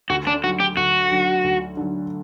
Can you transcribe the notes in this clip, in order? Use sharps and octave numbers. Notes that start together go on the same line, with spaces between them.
D2 F#4
D4
D3 F#3 F#4
G4
D2 F#4
D3 F#3
D2
D3 F#3